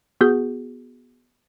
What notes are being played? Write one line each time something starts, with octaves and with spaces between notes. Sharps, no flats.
B3 F#4 G#4 G6